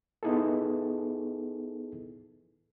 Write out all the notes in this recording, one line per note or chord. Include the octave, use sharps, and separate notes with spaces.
B3 D#4 E4 G#4 A4